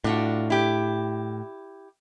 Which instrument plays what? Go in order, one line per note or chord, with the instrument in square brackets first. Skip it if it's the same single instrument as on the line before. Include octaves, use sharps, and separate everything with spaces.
[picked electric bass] A2 [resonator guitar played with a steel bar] D4 F4 F#4
[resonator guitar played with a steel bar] E4 G4